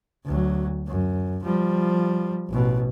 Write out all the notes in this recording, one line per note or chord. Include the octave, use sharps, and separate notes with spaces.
D2 F#3
F#2
F3 G3
A1 B2